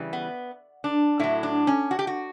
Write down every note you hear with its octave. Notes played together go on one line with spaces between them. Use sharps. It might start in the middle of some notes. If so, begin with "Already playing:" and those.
Already playing: C#3 E3 G3
B3
D4
A2 F#3 E4
D4
C#4
F#4
G4
F#4